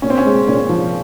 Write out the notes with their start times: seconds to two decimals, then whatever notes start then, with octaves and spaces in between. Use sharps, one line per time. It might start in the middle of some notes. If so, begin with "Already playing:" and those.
0.02 A#2 C#4
0.10 C4
0.18 C#4
0.25 G#3
0.48 A#2 C#4
0.69 F3